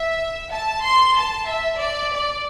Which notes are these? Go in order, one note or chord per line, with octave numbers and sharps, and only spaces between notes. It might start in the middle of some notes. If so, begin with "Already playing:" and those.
Already playing: E5
A5
C6
A5
E5
D5
D5